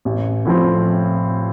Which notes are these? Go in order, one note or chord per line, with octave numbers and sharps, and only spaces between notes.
A1
A2 F3 C4